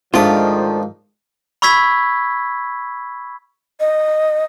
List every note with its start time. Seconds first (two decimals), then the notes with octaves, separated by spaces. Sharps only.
0.14 G#2 D#3 F3 A3 D4 F4 D#6
1.62 B5 C#6 E6 G#6 B6
3.80 D#5